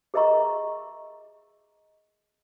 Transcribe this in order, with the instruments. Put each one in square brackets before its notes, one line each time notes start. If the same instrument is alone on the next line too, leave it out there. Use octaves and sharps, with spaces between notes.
[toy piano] G#4 A#4 D#5 E5 A#5 C#6